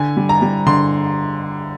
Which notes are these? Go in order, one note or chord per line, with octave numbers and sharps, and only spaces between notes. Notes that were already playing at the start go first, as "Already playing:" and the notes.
Already playing: D3 G#5
G3
A#5
G3
D3 C6